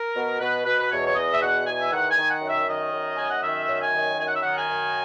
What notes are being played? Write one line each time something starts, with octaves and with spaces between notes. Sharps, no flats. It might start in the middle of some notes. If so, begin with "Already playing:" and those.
Already playing: A#4
B2
B2 B4
B2 B4
B4
E2 C#5
C#5
E2 D#5
E5
B2 F#5
E2 G#5
E5
D#3 F#5
G#5
D#3
F#5
F#2
E5
D#3 D#5
F#2
F#2 G#5
F#5
D#3 E5
F#2
G#5
D#3
F#2 G#5
F#5
E5
D#3 F#5
G#5
F#2